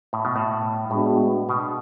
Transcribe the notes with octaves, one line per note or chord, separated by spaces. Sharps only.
A2
B2
A2
A2 G#3 B3 D4 F#4
B2